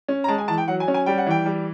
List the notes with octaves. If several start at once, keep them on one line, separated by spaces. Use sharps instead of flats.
C#4
A#5
G#3 A5
G#5
E3 A5
G5
F#3 F#5
G#5
C#4
G#5
G3 G5
F#5
E3 G5
G3